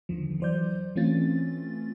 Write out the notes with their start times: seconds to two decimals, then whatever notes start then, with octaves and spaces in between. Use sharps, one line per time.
0.09 E2 D3 D#3 F3
0.40 E3 F#3 C5 D5 G6
0.96 E3 A3 C4 C#4 F4 A6